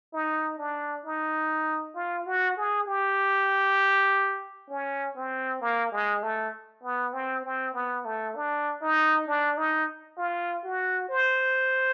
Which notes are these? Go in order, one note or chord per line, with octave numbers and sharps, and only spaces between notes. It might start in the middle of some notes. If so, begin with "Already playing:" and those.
D#4
D4
D#4
F4
F#4
G#4
G4
C#4
C4
A#3
G#3
A3
B3
C4
C4
B3
A3
D4
D#4
D4
D#4
F4
F#4
C5